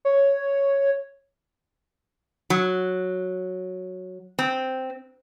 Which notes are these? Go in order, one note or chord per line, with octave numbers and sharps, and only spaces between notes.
C#5
F#3
C4